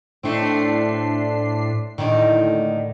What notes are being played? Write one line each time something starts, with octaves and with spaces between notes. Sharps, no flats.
A2 A3 C4 D4 C7
D#2 A2 D3 D#3